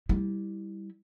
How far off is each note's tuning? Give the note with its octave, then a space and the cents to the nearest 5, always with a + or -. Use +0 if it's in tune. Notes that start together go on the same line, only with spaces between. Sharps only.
G3 +0 E4 -15